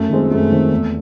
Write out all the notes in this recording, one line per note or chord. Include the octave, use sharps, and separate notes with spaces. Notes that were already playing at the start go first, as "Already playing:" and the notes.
Already playing: F#2 A3
D#3 G#3 C4
F#2 A3
D#3 G#3 C4
E2